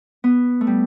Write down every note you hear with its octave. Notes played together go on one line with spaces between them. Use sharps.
B3
A3
G3